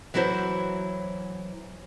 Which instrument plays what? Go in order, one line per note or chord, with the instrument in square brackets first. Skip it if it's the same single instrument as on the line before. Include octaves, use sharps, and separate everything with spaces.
[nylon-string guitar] E3 F#3 E4 F#4 C5